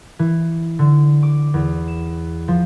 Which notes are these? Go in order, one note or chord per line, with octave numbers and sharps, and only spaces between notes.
E3
D3
D6
E2
E7
F3